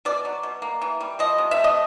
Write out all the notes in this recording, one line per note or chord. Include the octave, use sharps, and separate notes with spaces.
B2 D5
F#3
B2
A#3
E3
G3
F3 D#5
C3
E5
A3
D#5